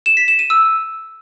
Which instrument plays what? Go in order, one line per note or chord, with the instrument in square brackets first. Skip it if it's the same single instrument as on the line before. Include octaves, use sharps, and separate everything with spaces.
[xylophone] E7
B6
E7
D#7
E6